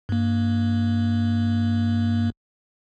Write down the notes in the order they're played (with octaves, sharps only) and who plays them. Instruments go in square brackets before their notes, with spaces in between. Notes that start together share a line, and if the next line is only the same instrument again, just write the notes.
[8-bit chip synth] G2 A#3